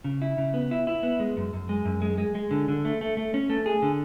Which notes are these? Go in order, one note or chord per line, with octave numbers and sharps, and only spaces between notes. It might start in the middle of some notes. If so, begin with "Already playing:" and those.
C#3
E4
C#3
B3
E4
E4
B3
G#3
F#2
F#2
G#3
F#2
G#3
G#3
G#3
D3
D3
A3
A3
A3
C#4
A3
G#4
D3